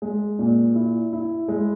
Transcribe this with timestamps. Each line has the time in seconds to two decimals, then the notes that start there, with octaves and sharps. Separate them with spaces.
0.02 G#3
0.39 A#2
0.75 E4
1.13 E4
1.48 G#3